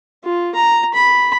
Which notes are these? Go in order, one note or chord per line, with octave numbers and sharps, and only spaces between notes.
F4
A#5
B5